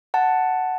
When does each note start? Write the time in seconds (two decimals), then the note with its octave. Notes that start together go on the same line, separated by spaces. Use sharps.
0.14 F#5 A5